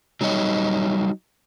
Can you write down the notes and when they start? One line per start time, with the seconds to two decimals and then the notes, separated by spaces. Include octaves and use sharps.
0.21 F#3 G3 D#4 C#5 D#5